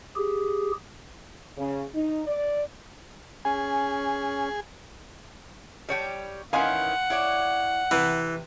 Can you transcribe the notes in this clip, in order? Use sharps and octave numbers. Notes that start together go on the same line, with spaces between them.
G4 G#4
C#3
D#4
D5
C#4 G#4 G#5
G3 C#5 G5
D#3 E3 C#4 F5 F#5 G#5 C6
E4 C#5 D5
C3 E3 B4